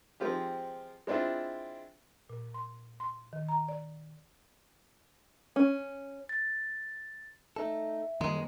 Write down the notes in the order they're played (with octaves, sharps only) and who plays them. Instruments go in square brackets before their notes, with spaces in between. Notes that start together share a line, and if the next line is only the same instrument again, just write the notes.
[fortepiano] F3 G#3 C4 F4 G4
G#3 C4 D4 E4 F4
[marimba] A#2
C6
C6
D#3
A#5
D5
[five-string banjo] C#4
[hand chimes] A6
[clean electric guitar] A3 D#4 A4 [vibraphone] E5
[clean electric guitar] F#2 A#3 D#5 [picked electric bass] D#3 G3 [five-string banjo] G#3